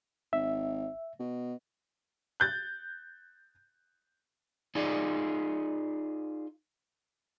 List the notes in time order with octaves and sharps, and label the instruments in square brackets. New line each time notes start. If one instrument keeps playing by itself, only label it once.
[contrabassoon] G#1 [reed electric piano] E5
[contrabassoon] B2
[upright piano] F#6 G6 A6
[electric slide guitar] D#4 F4 G#4 D5